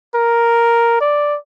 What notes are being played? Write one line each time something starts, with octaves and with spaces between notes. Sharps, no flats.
A#4
D5